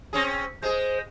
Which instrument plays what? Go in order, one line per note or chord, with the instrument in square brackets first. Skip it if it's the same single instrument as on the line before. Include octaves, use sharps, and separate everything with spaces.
[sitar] C4 C#4 G#4
[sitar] G#3 G#4 [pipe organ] C5